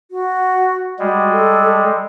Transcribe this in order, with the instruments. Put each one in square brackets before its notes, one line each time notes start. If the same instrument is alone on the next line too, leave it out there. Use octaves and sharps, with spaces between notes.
[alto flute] F#4
[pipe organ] G3 G#3 [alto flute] F#4
[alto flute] A4